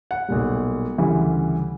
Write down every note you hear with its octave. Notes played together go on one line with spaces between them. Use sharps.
F#5
B1 A#2 G3
D2 C#3 E3 G3